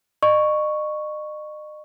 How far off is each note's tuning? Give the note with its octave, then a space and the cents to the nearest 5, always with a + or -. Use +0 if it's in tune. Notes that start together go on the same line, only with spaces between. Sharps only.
D#5 -40 C#6 +0